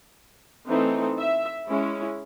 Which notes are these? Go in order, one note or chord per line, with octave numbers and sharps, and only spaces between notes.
E3 A3 C4 D#4
E5
G#3 C#4 E4